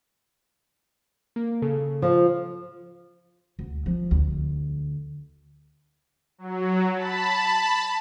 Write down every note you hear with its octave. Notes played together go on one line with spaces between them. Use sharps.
A#3
C#3 A4
F3
D2
F3
D2
F#3
A5 B5